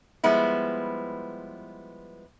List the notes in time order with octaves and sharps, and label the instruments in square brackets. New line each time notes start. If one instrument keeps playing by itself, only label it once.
[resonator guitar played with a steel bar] F3 G3 G#3 B3 E4